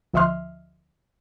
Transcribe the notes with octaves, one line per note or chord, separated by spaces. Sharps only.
D2 F3 D#5 E5 C6 F6